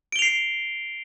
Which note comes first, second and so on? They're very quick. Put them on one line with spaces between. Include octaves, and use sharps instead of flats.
D7 G7 F7 C7